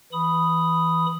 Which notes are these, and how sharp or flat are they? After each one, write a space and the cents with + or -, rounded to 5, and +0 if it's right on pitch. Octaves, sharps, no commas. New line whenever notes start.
E3 +0 B5 +0 D#6 +0